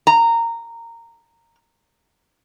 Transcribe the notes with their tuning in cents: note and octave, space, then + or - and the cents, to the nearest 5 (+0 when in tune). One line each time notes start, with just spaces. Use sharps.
A#5 -15